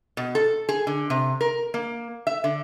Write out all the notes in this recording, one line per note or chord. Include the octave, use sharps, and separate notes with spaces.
B2
A4
G#4
D3
C3
A#4
A#3
E5
D3